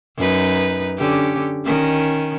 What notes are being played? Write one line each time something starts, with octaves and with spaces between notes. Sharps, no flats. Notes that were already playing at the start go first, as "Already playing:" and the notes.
F#2 D#4 B4
D3 C#4 G4
D#3 C#4